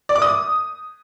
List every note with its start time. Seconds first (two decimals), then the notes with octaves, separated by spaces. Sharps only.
0.09 D5
0.15 D6
0.22 D#6